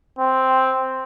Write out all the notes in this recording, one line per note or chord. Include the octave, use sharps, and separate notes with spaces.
C4